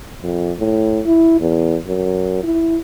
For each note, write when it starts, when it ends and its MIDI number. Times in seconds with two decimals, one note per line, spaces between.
0.22 0.52 41
0.58 1.00 45
1.06 1.39 64
1.40 1.78 40
1.86 2.43 42
2.43 2.77 64